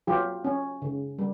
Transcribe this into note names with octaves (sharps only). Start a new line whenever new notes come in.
F#3 F4 G4
C#4
C#3
G3